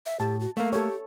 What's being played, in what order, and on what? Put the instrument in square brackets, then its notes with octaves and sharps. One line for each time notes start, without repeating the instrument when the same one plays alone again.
[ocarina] E5
[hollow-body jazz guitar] A2 [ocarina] G4 [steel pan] A5
[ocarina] F#4
[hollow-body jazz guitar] A3 A#3 [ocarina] F5
[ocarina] G4 [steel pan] A4 C#5